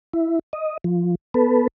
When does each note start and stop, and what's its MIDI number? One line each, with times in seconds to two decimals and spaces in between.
0.13 0.39 64
0.53 0.78 75
0.84 1.15 53
1.34 1.68 59
1.34 1.68 69
1.34 1.68 71